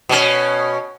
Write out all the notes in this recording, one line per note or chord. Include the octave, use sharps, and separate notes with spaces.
B2 C#4